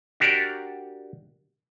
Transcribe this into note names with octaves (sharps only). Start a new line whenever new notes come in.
D4 F#4 G4 A#4 D5